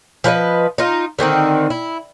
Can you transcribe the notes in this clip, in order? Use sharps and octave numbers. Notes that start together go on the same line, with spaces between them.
F3 B4 D5 D#5
D#4 F4
D3 D#3 C4 D#4
E4